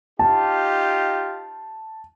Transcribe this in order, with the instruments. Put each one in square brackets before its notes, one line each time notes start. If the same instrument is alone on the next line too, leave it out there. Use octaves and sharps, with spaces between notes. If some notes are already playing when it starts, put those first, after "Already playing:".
[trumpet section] D#4 F4 G4 [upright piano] A5